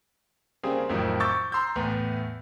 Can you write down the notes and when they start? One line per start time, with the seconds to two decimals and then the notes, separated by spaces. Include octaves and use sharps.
0.63 C#3 G3 A#3 C4 G#4
0.89 F2 A2 D#3 F3 F#3
1.20 C#6 D6 E6 G6 A6
1.52 A#5 C6 E6 G6
1.76 E2 A2 B3